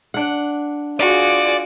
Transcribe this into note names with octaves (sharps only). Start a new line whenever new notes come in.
D4 F#5
F4 F#4 G#4 D5